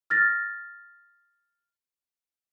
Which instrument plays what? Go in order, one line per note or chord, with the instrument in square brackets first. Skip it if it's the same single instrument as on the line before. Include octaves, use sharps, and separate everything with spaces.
[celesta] F6 A6 A#6